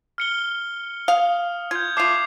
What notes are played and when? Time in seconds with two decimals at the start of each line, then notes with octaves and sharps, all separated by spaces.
0.18 F6 C#7 G7
1.08 F5 D#6
1.71 F4 G6 G#6
1.97 A3 F4 D6 C7 F7